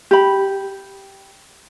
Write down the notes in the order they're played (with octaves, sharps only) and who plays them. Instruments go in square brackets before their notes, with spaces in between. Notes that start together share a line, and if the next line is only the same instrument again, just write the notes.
[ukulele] G4 B5